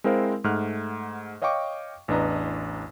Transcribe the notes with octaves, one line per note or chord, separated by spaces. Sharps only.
G#3 C4 E4 A#4 C5 F5
G#2 A3 F#5 F6 F#6
C#5 D#5 F5 G5 C#6 D6
A1 E2 D4 B4 D#5 A#5